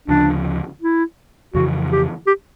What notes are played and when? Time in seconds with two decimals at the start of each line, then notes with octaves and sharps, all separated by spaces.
0.08 D2 C#3 F3 D4
0.82 E4
1.54 F2 C#3 E3 F#4
1.92 G4
2.27 G4